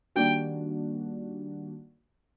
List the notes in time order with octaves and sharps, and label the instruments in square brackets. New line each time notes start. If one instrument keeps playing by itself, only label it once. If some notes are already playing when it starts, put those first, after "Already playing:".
[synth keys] D#3 G3 A#3 D4 F#4 [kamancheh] G5